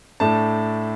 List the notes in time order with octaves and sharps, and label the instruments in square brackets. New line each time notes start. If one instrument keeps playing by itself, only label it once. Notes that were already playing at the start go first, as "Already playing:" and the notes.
[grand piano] A2 A3 D4 A5